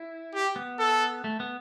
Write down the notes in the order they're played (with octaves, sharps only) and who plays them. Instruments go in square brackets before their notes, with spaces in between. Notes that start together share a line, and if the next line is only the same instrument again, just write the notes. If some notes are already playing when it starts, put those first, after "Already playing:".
Already playing: [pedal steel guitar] E4
[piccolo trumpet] G4
[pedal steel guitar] B3
[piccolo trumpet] A4
[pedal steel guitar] A3
B3